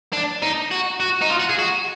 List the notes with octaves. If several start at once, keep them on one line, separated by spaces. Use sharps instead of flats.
D4
D#4
F#4
F#4
D#4
F4
F#4
G#4
F#4